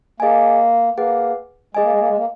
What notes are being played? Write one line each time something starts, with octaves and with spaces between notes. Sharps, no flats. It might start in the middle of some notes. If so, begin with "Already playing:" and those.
A#3 G#4 D#5 G#5
A#3 G#4 B4 F#5
G#3 G#4 D#5 G#5
A#3
G#3
A#3
G#3
A#3